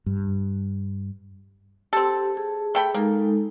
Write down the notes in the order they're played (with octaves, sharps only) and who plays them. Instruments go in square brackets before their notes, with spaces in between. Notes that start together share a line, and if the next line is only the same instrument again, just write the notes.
[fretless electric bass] G2
[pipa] C4 A4 [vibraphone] G4
[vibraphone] G#4
[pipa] A3 G5 B5
[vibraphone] G#3 D#4 A4 [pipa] A#3